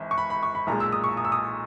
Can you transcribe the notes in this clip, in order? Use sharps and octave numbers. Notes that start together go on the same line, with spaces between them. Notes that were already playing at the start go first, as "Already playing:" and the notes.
Already playing: G#1 E3
C#6
B5
B5
C#6
B5
B1 A#2 G#3 A#5
E6
D#6
C#6
D#6
E6
D#6